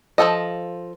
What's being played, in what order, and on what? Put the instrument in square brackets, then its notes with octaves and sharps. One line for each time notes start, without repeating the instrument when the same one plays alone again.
[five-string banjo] F3 F#3 A4 D#5